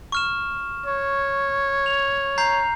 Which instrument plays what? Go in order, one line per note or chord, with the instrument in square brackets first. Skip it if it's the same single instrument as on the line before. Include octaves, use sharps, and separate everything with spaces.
[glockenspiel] C#6 F6 E7
[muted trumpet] C#5
[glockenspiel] F7
A#5 G6 C7